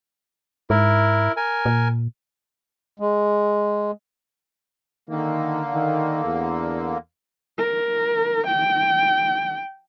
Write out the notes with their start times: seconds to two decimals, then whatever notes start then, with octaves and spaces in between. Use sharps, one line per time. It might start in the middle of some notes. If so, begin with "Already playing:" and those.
0.70 G#2 E4 A#4
1.37 A#4 G#5
1.66 A#2
3.00 G#3
5.09 D3 D#3 A#3
5.74 D#3
6.25 E2
7.58 A#4
8.47 G5